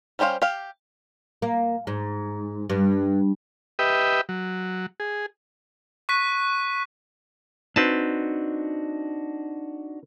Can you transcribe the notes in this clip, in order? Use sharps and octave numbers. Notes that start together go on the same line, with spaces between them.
G3 C#4 G4 C5 F5
G4 F5
A#3
G#2
G2
G4 B4 D#5 E5 G5
F#3
G#4
C#6 F#6 B6 D#7
C4 D4 D#4 F#4 B4 A5